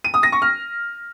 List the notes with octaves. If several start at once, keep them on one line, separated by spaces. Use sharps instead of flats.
D#7
D#6
A#6
C#6
F6